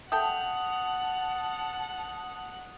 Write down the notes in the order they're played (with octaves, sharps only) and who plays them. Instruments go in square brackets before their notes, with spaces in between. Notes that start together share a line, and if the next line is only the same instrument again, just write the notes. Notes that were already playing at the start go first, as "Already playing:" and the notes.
[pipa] A4 E5 G5 [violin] F#5 [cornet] A5 [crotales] D#6